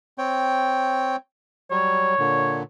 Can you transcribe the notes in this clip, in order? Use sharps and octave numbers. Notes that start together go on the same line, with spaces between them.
C4 C#5 G5
F#3 G3 C#5
A#2 D3